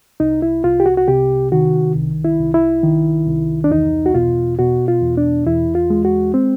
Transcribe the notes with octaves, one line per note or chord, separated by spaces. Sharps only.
C2 D#4
E4
C2 F4
G4
F#4
F#4
C3 G4
D#3 F#4
C2
E4
C2
E4
D#3
C2
D4
E2 D#4
F#4
B2 F4
B2 F#4
F4
E2
D4
E2 E4
F4
G#3
F#4
C4